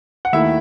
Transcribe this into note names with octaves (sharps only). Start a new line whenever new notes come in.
F#5
D#2 D#3 A3 E4 E5